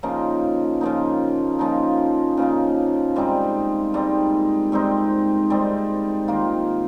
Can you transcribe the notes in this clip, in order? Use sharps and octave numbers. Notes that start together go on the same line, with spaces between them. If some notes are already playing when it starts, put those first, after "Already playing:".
C#3 F3 A#3 D#4
C#3 F3 A#3 D#4
C#3 F3 A#3 D#4
C#3 F3 A#3 D#4
G#2 G3 C4 D#4
G#2 G3 C4 D#4
G#2 G3 C4 D#4
G#2 G3 C4 D#4
D#3 A#3 F4